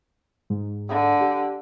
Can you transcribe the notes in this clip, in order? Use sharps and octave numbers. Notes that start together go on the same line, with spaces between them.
G#2
D3
G4